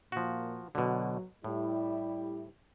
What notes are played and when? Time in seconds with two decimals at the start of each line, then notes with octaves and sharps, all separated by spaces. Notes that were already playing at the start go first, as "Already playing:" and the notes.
0.12 A#2 F3 F#4
0.75 B2 D3 F#3
1.44 A2 G3 E4